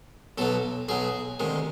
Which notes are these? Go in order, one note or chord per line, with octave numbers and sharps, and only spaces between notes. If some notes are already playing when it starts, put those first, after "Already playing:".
B1 B2 F#3 A4
B1 B2 F#3 G#4
D2 C3 D#3 G#3